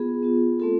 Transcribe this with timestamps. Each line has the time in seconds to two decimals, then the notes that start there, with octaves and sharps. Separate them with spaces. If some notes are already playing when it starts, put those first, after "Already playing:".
Already playing: B3 F4 G#4
0.22 B3 F4
0.60 A3 C4 F4 A4